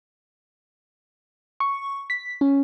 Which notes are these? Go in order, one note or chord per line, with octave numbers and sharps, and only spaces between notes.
C#6
B6
C#4